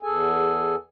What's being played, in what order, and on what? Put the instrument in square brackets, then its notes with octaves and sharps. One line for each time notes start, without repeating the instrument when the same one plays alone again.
[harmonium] E2 G#4 A4 G#5